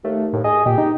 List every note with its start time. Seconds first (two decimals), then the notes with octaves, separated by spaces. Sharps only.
0.04 D#2 A3
0.33 D#2 A2
0.44 G#4 D#5
0.66 A#2 G4
0.78 D#4